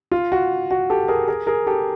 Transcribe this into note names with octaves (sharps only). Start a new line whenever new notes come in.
F4
F#4
F#4
G4 A4
G#4 A#4
G#4 A#4
G#4 A#4
G4 A4